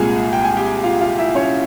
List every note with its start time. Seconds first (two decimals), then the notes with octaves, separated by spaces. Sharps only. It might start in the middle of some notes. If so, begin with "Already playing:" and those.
Already playing: C2 A#2 G#3 G#4 G#5
0.33 G5
0.45 G#5
0.56 G4 G5
0.84 F4 F5
1.01 F4 F5
1.18 E4 E5
1.35 C#4 C#5